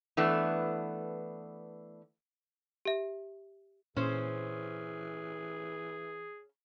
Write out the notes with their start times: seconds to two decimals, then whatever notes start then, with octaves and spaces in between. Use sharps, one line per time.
0.17 E3 A3 B3 D4
2.85 G4 E5
3.97 A#2 E3 C#4 G#4 C5